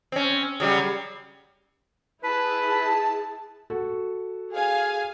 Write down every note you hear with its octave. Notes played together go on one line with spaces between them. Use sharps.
C4 C#4
C#3 F#3 G3
E4 G#4 B4 A5
F#4 A4
G#4 F5 G#5